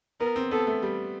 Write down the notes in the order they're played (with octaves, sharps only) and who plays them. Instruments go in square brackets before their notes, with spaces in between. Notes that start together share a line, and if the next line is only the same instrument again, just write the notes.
[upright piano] B3 [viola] A#4
[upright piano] C4
[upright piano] B3 [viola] A4
[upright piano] A3
G3